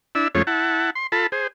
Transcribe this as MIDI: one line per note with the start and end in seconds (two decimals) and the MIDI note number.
0.15 0.28 62
0.15 0.28 64
0.15 0.28 88
0.35 0.42 41
0.35 0.42 56
0.35 0.42 57
0.35 0.42 61
0.35 0.42 65
0.35 0.42 73
0.47 0.90 64
0.47 0.90 78
0.47 0.90 81
0.95 1.07 84
1.12 1.27 65
1.12 1.27 69
1.12 1.27 81
1.12 1.27 83
1.32 1.47 68
1.32 1.47 72